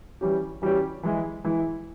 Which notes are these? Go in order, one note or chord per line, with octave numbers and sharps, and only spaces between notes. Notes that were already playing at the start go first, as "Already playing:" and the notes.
E3 G3 C#4 G4
E3 G3 C#4 G4
E3 G#3 E4
E3 G#3 E4